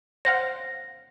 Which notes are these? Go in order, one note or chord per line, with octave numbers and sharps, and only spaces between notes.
C5 F5 F#5 A#6